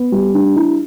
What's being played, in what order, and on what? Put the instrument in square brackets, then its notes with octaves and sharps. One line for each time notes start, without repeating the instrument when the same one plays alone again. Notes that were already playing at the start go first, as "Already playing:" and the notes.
Already playing: [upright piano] B3
G3
D4
E4